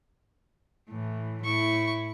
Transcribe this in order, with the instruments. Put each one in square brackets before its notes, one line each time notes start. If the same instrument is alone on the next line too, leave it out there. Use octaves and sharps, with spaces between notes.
[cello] A2 E3
[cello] A2 E4 [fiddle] C#6